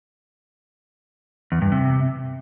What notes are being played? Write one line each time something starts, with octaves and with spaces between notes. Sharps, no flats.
E2
G2
C3